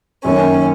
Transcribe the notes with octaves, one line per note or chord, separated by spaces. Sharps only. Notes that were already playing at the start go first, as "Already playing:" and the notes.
F#2 D#3 A#3 C#4